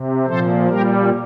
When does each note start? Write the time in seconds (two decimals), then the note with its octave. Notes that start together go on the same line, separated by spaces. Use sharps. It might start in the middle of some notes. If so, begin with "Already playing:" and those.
Already playing: C3
0.26 A#2 F3 A4 C5
0.69 A#2 G3 G4 A#4